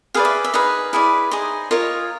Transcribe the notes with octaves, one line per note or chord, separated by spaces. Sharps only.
G#4 B4 D5 F5
E5
E5
D#4 G#4 B4 F5
E4 G#4 B4 D5
D#4 G#4 C5
F4 A#4 C#5 D#5